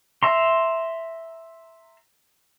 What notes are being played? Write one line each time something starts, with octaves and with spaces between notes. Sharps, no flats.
E5 A#5 C6